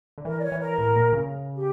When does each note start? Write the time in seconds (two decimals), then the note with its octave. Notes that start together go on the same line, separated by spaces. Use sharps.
0.18 D3
0.25 E3 A#4
0.39 D5
0.43 C#5
0.52 E3
0.61 A#4
0.78 A2
0.96 A#2
1.13 C#3
1.57 G4